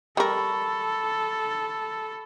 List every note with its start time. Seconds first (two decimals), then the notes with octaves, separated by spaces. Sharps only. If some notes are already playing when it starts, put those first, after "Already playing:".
0.17 G3 A4 A#4 B5 C#6